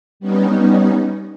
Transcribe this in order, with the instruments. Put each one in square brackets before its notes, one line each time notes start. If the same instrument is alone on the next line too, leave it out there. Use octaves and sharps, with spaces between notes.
[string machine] G3 B3 C#4 D#4